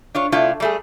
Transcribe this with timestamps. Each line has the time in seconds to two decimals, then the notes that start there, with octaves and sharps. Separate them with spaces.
0.15 D4 F4 C#5
0.32 C3 A3 D4 E4 F4
0.60 G3 A3 G#4